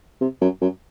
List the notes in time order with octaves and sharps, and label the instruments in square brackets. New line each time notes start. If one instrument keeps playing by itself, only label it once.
[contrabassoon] C3
F#2
F#2